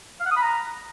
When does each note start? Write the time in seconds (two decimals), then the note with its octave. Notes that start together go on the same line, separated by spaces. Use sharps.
0.20 F5
0.26 F#5
0.31 D#6
0.36 B5
0.42 A#5